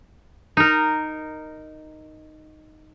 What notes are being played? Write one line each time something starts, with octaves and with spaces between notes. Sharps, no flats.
D#4 A#4